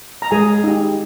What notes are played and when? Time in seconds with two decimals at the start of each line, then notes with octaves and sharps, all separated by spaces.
0.22 A#5
0.31 G#3 G#4 G#5
0.64 D#4 G4